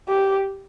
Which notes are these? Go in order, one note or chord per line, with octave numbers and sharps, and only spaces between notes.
G4